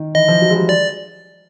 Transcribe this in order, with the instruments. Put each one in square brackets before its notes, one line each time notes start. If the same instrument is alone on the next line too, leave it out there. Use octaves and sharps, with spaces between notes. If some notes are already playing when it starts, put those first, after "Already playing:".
Already playing: [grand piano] D#3
[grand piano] E3 [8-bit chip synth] D#5
[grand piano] F3
F#3
G#3
G3
[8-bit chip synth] D5